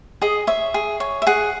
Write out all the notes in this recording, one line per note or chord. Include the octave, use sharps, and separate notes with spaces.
G#4 D#5
C#5 E5
G#4
C#5
E5
G#4 F#5